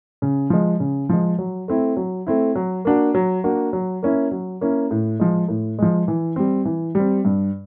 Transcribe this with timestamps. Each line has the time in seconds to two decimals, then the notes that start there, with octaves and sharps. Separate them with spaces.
0.22 C#3
0.50 F3 G#3
0.80 C#3
1.09 F3 G#3
1.39 F#3
1.68 A3 C4 E4
1.97 F#3
2.27 A3 C4 E4
2.55 F#3
2.85 A#3 D4 F#4
3.15 F#3
3.44 A#3 D4 F#4
3.73 F#3
4.03 A#3 C#4 E4
4.31 F#3
4.61 A#3 C#4 E4
4.91 A2
5.20 F3 G#3
5.48 A2
5.79 F3 G#3
6.08 E3
6.36 G3 C4
6.65 E3
6.95 G3 C4
7.25 G2